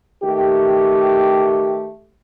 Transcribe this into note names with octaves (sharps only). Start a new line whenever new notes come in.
D#3 A3 G4